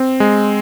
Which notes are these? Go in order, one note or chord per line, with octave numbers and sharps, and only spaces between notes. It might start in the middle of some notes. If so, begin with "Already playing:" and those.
Already playing: C4
G#3